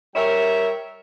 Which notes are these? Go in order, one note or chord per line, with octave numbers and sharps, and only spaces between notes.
G3 A#4 C#5 E5